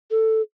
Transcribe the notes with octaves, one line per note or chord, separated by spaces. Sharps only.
A4